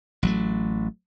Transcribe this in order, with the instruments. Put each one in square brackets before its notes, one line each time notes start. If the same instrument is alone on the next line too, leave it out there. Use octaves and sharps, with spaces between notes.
[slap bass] A1 F#3 A3